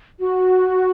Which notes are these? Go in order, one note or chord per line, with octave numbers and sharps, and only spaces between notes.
F#4